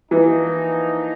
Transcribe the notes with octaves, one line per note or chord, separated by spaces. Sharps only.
E3 F3 A#3 D#4